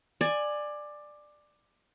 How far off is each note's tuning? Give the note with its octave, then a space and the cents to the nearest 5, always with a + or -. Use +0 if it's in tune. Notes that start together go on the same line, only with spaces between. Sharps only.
D5 +15 G#5 +0